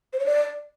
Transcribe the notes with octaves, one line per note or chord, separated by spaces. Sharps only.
C5
C#5
D5